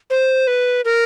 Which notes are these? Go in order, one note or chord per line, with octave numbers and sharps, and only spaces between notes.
C5
B4
A#4